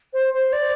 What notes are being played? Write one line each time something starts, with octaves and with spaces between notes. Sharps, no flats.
C5
C5
D5